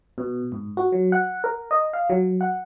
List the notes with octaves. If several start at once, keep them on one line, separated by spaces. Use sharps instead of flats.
B2
G#2
F#4
F#3
F#5
A#4
D#5
F5
F#3
F#5